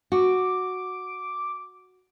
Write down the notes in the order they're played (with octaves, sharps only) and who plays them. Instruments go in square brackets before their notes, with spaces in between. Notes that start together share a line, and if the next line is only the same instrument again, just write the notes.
[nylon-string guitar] F#4 [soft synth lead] D6